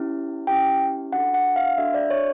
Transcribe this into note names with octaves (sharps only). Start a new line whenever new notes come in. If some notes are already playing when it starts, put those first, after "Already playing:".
Already playing: C#4 E4 G4
C#4 E4 G4 G5
D4 F#4 A4 F#5
F#5
F5
D4 F#4 A4 E5
D5
C#5